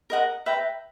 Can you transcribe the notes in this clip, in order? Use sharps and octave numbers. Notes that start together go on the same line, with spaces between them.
A#4 D#5 F#5 A#5
B4 E5 G5 A#5